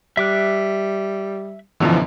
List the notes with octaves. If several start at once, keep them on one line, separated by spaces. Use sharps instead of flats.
G3 E5 D6 F#6
F#2 B2 D3 E3 F3